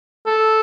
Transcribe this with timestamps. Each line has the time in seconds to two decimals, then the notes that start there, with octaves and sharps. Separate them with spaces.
0.26 A4